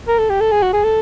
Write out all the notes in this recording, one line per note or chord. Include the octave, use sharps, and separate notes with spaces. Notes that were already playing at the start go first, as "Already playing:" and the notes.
A#4
A4
G4
A4
G#4
F#4
G#4
A4